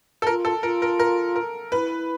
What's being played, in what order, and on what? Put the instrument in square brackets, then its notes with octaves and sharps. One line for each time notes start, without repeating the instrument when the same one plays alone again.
[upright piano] A4
[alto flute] F4 [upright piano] A#4
[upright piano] A4
[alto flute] F4 [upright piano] A#4
[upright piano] A#4
A#4
A#4
[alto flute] E4 [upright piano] B4